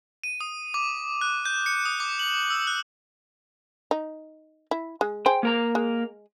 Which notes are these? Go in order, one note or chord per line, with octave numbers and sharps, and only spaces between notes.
D#7
D#6
D6
F#6
G6
C#7
D#6
D6
F#7
E6
F#6
D#4
E4
G#3
G#4 C5 G5
A#3 A#4 A#5
G#3